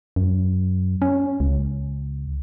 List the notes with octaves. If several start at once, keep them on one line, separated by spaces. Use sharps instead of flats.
F#2
C#4
C#2